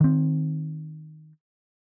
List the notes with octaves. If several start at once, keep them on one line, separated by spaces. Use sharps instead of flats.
D#3 C4